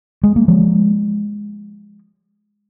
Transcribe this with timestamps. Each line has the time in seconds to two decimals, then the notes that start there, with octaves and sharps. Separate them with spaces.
0.24 G#3
0.36 A#3
0.48 F3 G#3